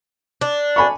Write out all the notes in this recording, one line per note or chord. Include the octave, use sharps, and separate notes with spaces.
D4
G#5 B5 C#6